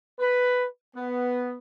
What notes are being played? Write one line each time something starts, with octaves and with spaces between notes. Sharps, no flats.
B4
B3